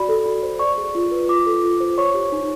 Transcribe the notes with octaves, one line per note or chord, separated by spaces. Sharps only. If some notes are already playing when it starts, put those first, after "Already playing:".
Already playing: F#4 D5 B5
A4
F#4
C5
D5 C#6
G#4
F4
B4
F4 D6
A4
F4
C5
C#5 C#6
G4
D#4